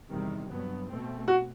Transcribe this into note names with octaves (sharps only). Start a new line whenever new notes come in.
E2 C3 D#3 G3
G2 F#3 B3
B2 A3 C4
F#4